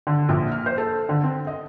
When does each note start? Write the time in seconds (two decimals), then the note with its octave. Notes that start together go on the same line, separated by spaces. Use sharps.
0.07 D3
0.29 A#1
0.52 F6
0.66 C5
0.78 A4
1.09 D3
1.23 C4
1.47 D#5